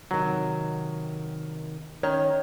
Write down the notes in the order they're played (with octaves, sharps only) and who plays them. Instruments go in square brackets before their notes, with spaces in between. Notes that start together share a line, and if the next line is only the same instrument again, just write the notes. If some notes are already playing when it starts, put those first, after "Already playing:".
[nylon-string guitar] C3 D#3 [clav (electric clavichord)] F#3
[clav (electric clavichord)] D#3 [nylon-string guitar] C#4 [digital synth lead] C#5